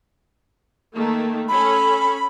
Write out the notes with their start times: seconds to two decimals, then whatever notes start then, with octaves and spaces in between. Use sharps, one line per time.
0.94 D#3 A3 A#3
1.48 C#4 A4 B5